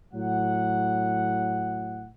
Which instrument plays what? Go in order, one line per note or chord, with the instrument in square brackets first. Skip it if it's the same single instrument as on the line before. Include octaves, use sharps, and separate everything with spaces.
[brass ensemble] A2 F#3 F#5